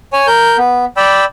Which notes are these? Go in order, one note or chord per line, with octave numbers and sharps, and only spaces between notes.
C#5 G#5
A#4 G6
B3
D5 G5 B5 E6